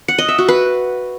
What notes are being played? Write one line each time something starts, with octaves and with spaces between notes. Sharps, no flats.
F#5
D#5
E5
F#4
B4